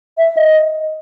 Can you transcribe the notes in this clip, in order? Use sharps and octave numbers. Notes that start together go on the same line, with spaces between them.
E5
D#5